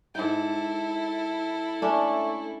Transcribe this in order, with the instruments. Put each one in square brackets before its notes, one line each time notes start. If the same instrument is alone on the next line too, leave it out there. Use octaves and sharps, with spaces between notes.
[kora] G#2 G5 [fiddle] E4 A4
[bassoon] A3 [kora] C#4 D4